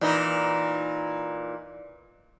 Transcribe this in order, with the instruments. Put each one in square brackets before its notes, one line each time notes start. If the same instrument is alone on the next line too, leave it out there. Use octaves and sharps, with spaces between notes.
[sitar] A#2 E3 D#4